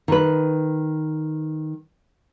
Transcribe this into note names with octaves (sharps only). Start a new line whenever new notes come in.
D#3 B4